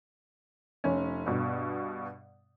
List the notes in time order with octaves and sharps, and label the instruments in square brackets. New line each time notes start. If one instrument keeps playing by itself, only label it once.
[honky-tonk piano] F1 C#4
G2 B2